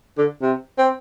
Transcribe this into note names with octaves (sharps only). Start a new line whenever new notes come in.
D3
C3
C4